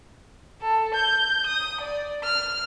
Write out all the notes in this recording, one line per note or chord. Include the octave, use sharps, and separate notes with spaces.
A4
G6
D#6
D5
F6